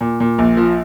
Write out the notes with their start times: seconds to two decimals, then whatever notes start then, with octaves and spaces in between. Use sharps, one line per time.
0.01 A#2
0.20 A#2
0.38 A#1
0.57 F3